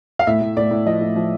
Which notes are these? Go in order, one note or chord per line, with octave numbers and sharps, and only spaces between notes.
F5
A2 E5
A2
A2 D5
A2
F3 D#5
A2
F3